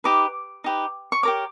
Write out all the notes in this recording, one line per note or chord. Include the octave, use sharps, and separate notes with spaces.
D#4 G4 B4 D6
D#4 G4 B4
C#6
G4 A#4 C#5 D6